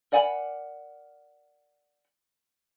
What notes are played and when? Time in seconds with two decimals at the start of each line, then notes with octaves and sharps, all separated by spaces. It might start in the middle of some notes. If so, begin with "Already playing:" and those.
0.12 A#4 D5 F#5 G#5 B5